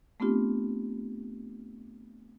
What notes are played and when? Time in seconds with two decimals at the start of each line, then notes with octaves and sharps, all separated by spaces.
0.20 A3 B3 C4 D4 F4 G4